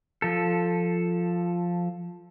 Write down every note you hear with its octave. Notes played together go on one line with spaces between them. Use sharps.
F3 A4